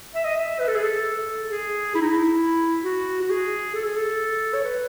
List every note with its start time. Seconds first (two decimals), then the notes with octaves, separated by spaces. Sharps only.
0.15 E5
0.25 D#5
0.36 E5
0.60 B4
0.68 A4
0.76 G#4
0.83 A4
1.50 G#4
1.95 E4
2.01 D#4
2.09 E4
2.84 F#4
3.21 F#4
3.30 G#4
3.74 A4
3.85 G#4
3.97 A4
4.53 C#5
4.64 B4